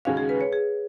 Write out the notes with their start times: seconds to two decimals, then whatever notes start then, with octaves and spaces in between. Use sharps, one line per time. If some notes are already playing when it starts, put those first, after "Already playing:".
0.05 D#2 C#3 G#3 C#4 F#4 F5
0.17 G#4
0.29 B4
0.41 C#5
0.53 G#4